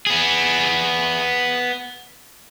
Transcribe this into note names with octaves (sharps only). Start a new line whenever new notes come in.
B3 G#4